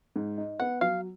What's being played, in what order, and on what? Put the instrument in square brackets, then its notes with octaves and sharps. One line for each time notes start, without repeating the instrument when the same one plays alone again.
[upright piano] G#2
D#4
[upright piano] B3 [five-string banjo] F#5
[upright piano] F#3 [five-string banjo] F5